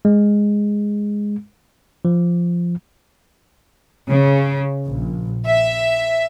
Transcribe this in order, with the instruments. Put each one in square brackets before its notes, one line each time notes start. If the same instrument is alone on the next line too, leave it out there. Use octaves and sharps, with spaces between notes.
[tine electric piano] G#3
F3
[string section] C#3
A#1
E5